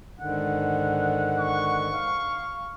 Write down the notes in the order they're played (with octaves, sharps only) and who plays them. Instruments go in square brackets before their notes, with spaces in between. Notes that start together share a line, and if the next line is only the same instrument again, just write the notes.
[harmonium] G#2 D3 D#3 [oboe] F#5
[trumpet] C#6
[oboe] F5